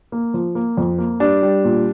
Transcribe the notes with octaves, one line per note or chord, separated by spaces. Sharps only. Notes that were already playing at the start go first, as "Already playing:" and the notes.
A#3
F3
A#3
F2
A#3
G3 D4
G3
A#2